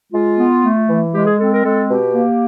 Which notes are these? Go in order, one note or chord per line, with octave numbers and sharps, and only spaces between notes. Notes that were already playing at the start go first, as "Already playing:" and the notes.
G#3 F4
B3
A3
E3
G#3 G4
G#4
C4 A4
A#4
G#3 A4
B2 G4
A#3